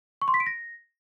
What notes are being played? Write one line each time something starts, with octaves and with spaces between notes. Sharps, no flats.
C#6
C6
B6
D7
A#6